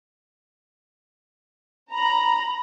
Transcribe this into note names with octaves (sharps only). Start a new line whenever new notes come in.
A#5 B5